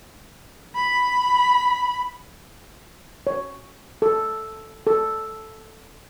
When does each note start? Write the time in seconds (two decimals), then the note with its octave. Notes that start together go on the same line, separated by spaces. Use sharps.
0.75 B5
3.27 C#5
4.02 A4
4.87 A4